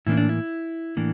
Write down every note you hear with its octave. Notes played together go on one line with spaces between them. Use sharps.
A2 E3 A#3 D4 E4
D4
E4
A2 E3 A#3 D4